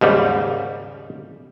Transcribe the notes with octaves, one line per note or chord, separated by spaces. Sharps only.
D#2 G#2 C#3 G3